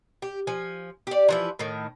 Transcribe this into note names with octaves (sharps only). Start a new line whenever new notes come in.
G4
F3 G#5
G4 D5
E3 F3 E4
A2 D#3